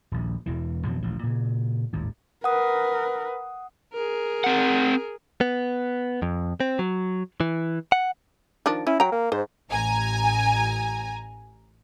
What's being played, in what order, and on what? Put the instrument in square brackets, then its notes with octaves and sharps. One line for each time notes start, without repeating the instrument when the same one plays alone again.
[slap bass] D#1 A#1
E1 E2 E3
F2 B2 E3 F3
D#1 A1 F3
A#2 C#3
G#1 D#2 A2
[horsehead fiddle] A#4 B4 [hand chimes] F#5 D#6
[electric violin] G#4 A#4
[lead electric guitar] C4 F#5
[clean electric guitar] B3
F2
C4
F#3
E3
F#5
[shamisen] D#3 F3 D4
[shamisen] C#4 [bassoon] E4
[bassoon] F#3 [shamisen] G5 A#5
[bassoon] A#3
[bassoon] G#2 [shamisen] C5
[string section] A1 G#5 A#5